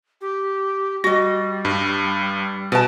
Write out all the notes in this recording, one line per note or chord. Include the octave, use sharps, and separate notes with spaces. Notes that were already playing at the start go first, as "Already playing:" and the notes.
G4
G3 F#4 D#5 A#6
G2
B2 B4 A5